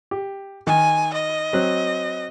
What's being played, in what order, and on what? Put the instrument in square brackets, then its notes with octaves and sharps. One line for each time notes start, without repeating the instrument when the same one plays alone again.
[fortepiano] G4
[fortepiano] D#3 [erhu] G#5
[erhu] D#5
[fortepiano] F#3 C4 F#6